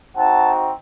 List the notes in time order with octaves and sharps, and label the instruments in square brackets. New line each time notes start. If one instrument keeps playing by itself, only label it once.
[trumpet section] C4 D#4 F#4 F#5 A5